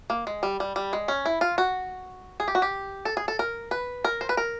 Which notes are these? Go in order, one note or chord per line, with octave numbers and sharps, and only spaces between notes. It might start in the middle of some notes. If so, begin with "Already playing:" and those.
A#3
G#3
G3
G3
G3
G#3
C#4
E4
F4
F#4
G#4
G4
F#4
G4
A4
G#4
A4
A#4
B4
A#4
C5
B4
A#4